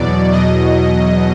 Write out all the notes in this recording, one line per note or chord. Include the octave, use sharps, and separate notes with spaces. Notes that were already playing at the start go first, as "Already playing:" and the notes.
Already playing: E2 B2 F#3 D5
E2 B2 F#3 D#5